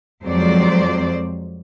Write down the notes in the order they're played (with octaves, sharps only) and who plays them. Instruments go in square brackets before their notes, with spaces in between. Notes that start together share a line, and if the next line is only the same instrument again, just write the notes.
[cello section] F2 F#3 G#3 C5 D5